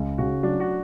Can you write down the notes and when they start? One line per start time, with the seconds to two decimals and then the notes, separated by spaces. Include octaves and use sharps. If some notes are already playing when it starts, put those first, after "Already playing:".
Already playing: C#2
0.18 C#3 F#4
0.43 F#3 D4
0.60 F#4